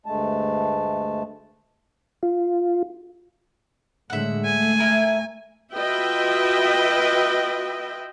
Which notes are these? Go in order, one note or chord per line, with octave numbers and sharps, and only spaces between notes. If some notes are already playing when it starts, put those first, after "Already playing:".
D2 G2 G#3 A3 A5
F4
A2 D3 G#3 E5 F#5
A3 G#5
E4 A#4
F4 F#4 B4 D#5 E5 G5